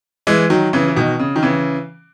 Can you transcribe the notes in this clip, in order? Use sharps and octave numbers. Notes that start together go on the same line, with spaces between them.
E3 G#3
D#3 F#3
C#3 E3
E3
B2 D#3
C#3
D#3
C#3 E3